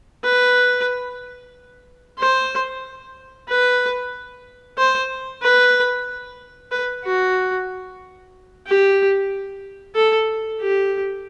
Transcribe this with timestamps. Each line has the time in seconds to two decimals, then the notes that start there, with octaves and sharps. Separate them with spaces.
0.24 B4
2.18 C5
3.49 B4
4.78 C5
5.42 B4
6.71 B4
7.05 F#4
8.67 G4
9.95 A4
10.61 G4